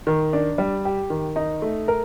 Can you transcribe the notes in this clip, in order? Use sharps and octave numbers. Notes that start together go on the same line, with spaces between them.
D#3
D4
G3
G4
D#3
D#4
A3
A#4